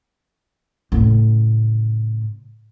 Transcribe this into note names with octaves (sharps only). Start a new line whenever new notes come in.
A2 C#3